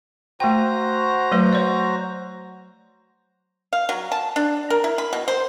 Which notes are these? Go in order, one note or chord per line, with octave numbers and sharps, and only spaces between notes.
A3 F#4 C5 G5 A#5
F#3 A3 B4
C#5 D5
F5
F#3
A5
D4
A#4
E4
B5
B2
C5